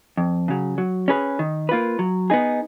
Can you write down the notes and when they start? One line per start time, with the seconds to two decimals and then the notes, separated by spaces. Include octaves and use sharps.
0.17 F2
0.48 C#3 F#3
0.78 F#3
1.08 C#4 G#4 B4
1.39 D#3
1.69 A#3 F4 B4
1.99 F#3
2.30 B3 D#4 G#4